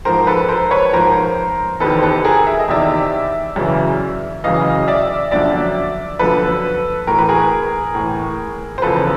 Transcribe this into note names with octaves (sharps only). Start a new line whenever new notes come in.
G#2 F3 A#4 C5
A4 B4
A#4 C5
B4 C#5
G#2 F3 A#4 C5
E2 C3 D#3 A4 B4
C5
A4 B4
G#4 A#4
E5
D#5
E2 C3 D#3 D5 E5
F#2 C#3 E3
F#2 C#3 E3 D#5 F5
D5 E5
F#2 D3 F3 D5 E5
F#2 D3 F3 A4 B4
A2 E3 A#4
B4
G#4 A#4
A2 E3
C5
E2 C#3 F3 A4 B4